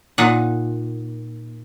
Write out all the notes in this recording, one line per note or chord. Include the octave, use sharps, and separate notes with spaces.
A#2 D#4 F#5